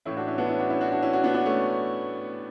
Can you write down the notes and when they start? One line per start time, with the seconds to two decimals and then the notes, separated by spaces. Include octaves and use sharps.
0.05 A2 E3 C#4 E4
0.16 D4 F#4
0.27 C#4 E4
0.38 B3 D4
0.48 C#4 E4
0.59 D4 F#4
0.70 C#4 E4
0.81 D4 F#4
0.92 D4 F#4
1.02 C#4 E4
1.13 D4 F#4
1.23 B3 D4
1.34 B3 D4
1.45 A3 C#4